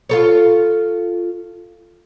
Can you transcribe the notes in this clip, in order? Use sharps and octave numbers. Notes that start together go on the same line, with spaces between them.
F4 A4 C#5